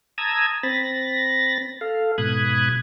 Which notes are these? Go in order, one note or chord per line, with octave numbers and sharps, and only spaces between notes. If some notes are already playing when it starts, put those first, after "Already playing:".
A5 A#5 D#6 E6 G#6
C4 B5 A6 A#6
A4 F5
G#2 B2 B5 D#6 F#6 G#6